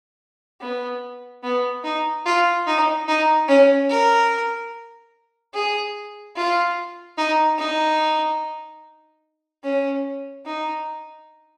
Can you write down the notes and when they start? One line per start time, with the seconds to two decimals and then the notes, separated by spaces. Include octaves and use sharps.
0.61 B3
1.43 B3
1.84 D#4
2.26 F4
2.67 D#4
3.08 D#4
3.48 C#4
3.89 A#4
5.54 G#4
6.36 F4
7.18 D#4
7.58 D#4
9.64 C#4
10.45 D#4